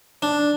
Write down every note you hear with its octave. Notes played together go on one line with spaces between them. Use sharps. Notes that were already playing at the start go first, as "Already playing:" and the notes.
D4